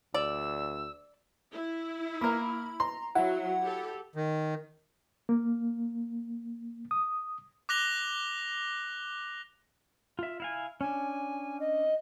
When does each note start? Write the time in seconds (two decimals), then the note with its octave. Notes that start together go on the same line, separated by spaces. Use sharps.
0.14 D2 D5 E6
1.53 E4
2.21 A#3 A#4 B5
2.80 A#5 C6
3.15 F#3 E4 F#5
3.64 G4 A4
4.16 D#3
5.29 A#3
6.91 D#6
7.69 D6 F#6 A#6 F7 G7
10.19 F4 E5
10.40 E4 F5 G#5
10.81 C#4 D4 G#5
11.60 D#5